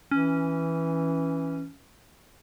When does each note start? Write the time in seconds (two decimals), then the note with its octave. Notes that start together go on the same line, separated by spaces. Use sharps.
0.11 E3 C#4